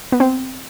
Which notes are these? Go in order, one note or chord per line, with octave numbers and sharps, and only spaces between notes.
B3
C4